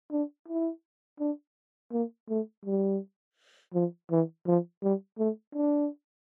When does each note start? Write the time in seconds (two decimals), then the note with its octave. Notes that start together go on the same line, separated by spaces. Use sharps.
0.12 D4
0.48 E4
1.20 D4
1.92 A#3
2.29 A3
2.65 G3
3.74 F3
4.11 E3
4.47 F3
4.83 G3
5.19 A3
5.55 D4